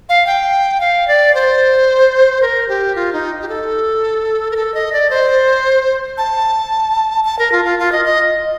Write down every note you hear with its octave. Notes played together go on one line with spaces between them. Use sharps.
F5
G5
F5
D5
C5
A#4
G4
F4
D#4
G4
A4
A#4
A4
D#5
D5
C5
A5
A5
A#4
F4
F4
F4
D#5
D#5